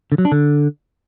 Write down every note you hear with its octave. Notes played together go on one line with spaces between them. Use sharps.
D3
F#3
D4
D3